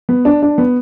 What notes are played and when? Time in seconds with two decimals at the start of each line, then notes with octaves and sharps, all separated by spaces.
0.09 B3
0.25 D4
0.43 D4
0.58 B3